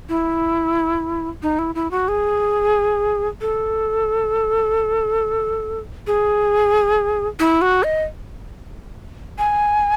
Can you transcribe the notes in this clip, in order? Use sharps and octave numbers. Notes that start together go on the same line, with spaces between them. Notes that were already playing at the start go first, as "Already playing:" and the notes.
E4
D#4
E4
E4
F#4
G#4
A4
G#4
E4
F#4
D#5
G#5